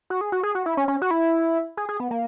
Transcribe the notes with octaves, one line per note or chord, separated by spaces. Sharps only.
F#4
G#4
F#4
G#4
F#4
E4
C#4
C#4
F#4
E4
G#4
G#4
B3
A#3